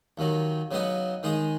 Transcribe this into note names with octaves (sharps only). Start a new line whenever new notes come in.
D#2 D#3 F#3
C#3 F#3 B3 D#4 F#4
D#3 G#3 D#4 G#4